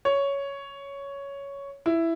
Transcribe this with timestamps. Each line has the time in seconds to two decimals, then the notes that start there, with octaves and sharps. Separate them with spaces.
0.05 C#5
1.86 E4